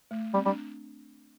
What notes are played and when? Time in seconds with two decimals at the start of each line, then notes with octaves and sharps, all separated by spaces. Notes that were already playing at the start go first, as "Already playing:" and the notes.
0.11 A3
0.34 G3 C4
0.45 G3 D4